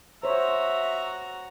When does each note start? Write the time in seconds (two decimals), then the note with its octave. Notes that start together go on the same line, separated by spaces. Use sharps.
0.23 F#4 C5 C#5 E5 A#5